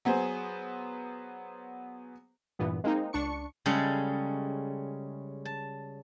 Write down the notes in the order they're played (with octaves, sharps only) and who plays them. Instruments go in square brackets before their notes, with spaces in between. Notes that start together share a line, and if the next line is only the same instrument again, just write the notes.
[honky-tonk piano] F#3 B3 G#4 C5
[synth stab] G2 A#2 E3 B3
G#3 A#3 C4 D#4
C#2 D4 C#6 C#7
[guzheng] C#3 G3 G#3 C#4 A4
A5